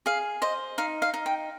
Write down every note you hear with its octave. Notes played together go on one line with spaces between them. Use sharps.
G#4 F5
C5 D#5
D#4 F5
F5
D#4
G5